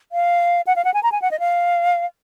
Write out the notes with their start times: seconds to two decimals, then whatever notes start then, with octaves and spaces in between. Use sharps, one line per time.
0.12 F5
0.67 F#5
0.76 F5
0.84 F#5
0.94 G#5
1.03 A#5
1.12 G#5
1.22 F#5
1.31 D#5
1.39 F5